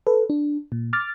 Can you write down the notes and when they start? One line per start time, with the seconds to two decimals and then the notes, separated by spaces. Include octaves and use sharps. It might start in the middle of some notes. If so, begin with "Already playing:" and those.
0.07 A4 B4
0.30 D4
0.72 A#2
0.93 D6 F6 A6